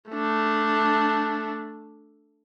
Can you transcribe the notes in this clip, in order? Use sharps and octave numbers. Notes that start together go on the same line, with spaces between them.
A3 D4